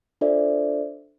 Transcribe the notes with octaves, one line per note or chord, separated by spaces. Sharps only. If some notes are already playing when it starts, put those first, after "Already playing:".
D4 F4 A4 C5 D5 E5